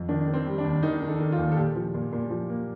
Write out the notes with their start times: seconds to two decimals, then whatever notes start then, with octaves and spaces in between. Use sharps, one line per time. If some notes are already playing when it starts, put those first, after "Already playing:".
Already playing: F2
0.09 D#3 D4
0.28 D#3
0.34 C4
0.46 G3
0.58 D4
0.65 D#2
0.83 D#3 D#4
1.02 D#3
1.08 A4
1.20 D#3
1.32 F4
1.39 D#2
1.52 A4
1.57 A#2 G4
1.76 F3
1.94 A#2
2.12 A#2
2.30 F3
2.49 A#3